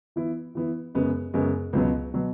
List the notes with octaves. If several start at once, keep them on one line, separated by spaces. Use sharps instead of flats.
E3 B3 E4
E3 B3 E4
F#2 C#3 G#3 B3
F#2 C#3 G#3 B3
C#2 B2 F#3 B3
B2 F#3 B3